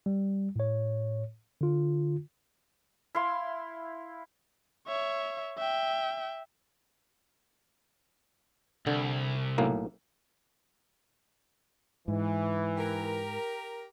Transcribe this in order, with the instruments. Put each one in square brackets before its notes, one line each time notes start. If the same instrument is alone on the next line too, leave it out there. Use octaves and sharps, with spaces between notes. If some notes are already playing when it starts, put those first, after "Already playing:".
[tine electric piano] G3
A2 C#5
D3 F4
[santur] E4 F5 C6
[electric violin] C#5 E5
E5 G5
[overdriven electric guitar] C2 [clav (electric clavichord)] D3
[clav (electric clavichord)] B1 A2 A#3
[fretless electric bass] G#2 [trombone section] E3
[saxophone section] G4 A#4